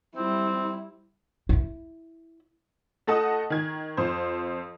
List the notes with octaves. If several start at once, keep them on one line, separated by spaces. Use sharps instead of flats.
G3 C4 E4
D#4 E4
A3 A4 D#5 F#5 A5 D#6
D#3 G#6
F2 C5